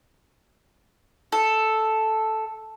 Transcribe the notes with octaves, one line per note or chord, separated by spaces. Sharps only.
A4